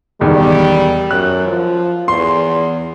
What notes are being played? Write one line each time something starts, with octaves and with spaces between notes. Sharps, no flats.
E1 E2 D#3 G3
F#2 F#6
F3
E2 C6